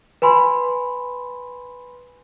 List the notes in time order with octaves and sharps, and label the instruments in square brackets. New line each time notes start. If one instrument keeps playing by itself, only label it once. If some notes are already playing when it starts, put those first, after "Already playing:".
[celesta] B4 G#5 B5 C6